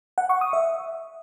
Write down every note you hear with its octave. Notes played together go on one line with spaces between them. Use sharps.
F#5
C#6
D#6
E5